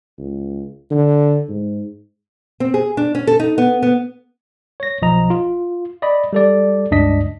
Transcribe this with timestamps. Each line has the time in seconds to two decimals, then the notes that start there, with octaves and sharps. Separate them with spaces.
0.18 C#2
0.91 D3
1.49 G#2
2.60 C4
2.74 G#4
2.97 D4
3.15 C#4
3.27 A4
3.40 D#4
3.58 B3
3.82 B3
4.80 C#5 A#6
5.02 B1 F3 D#5 A#5
5.30 F4
6.02 D5 D#5 B5
6.33 G3 A4 D5
6.91 C#2 G2 D4 D#5 B6